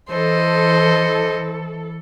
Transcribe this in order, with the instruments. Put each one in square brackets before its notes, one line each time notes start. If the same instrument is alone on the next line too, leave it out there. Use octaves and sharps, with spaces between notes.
[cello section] E3 A4 [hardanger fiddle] C5 D#5